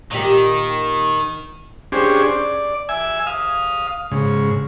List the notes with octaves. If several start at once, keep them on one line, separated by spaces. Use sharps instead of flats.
A#2 D#3 G4
C#4 D4 G4 G#4 C5
D5
E5 G#5
F5 D#6
G#2 C#3